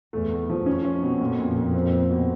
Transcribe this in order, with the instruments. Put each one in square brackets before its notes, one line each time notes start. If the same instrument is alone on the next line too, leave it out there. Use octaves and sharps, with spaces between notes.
[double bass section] E2 [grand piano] A3
[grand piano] A3
F3
[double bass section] F2 [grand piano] C#4
[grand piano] C#4
B2
A#2
A#2
A#2
C4
C4
B2